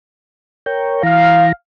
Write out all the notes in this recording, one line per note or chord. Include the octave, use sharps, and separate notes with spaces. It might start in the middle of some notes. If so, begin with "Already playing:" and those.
A#4 C#5 G5
E3 F5 A#5